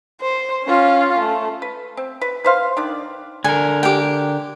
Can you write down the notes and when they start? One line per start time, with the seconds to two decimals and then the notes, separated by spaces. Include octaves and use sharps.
0.21 C5
0.65 C#4 F4
1.19 A3
1.62 B4
1.97 C4
2.21 B4
2.44 B4 C5 F5
2.77 D#3 D4 D5
3.44 D3 A#4 G#5
3.83 G4 G5